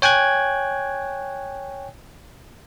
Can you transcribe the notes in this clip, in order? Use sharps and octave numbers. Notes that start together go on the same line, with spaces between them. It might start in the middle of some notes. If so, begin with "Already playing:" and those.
C#5 G5 G#5 F#6 G#6